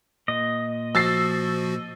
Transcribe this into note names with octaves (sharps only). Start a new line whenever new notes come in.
A#2 D#5
F3 F#4 E6 A6 C7